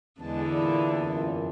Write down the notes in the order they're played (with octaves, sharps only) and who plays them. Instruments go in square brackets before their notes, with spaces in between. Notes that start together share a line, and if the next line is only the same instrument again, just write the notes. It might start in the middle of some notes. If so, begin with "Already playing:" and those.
[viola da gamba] E2 D3 [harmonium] G#3 A5
[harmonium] A#2 E4 D5
F#2 A#2